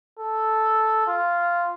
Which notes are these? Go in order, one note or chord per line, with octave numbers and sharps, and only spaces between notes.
A4
F4